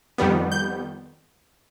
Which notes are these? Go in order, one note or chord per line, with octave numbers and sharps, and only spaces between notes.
F2 D#3 G3 B3
G6